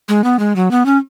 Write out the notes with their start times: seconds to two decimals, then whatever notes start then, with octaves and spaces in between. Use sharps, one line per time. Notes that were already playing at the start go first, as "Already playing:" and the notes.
0.08 G#3
0.24 B3
0.39 G#3
0.56 F#3
0.71 B3
0.86 C#4